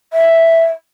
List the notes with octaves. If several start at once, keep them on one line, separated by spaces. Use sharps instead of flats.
E5